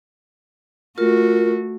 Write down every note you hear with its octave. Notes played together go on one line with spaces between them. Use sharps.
A3 F4 F#4 A#4